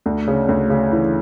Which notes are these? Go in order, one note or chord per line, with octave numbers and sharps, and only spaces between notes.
D2
C#3
D2
C#3
E3